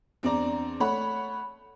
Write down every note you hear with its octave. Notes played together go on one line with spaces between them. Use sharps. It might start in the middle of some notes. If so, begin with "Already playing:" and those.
E2 C4 D4 D5 A#5
A3 C#5 F#5 B5